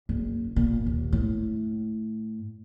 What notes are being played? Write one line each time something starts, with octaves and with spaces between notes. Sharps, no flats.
F#1
A#2
D#2
A2